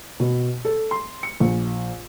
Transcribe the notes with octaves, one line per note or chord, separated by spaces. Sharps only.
B2
A4
C6
C#7
A#1